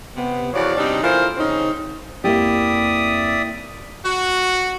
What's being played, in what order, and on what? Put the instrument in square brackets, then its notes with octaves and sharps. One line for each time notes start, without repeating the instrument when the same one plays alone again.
[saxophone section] C3 B3
E2 F3 F#4 C#5 D5
C3 G3 D4 D#4
E3 A3 F4 A#4 C5
C#3 C4 C#4 D#4
[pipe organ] F2 [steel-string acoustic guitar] A#3 E4 G4 [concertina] D5 E5 D#6
[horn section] F#4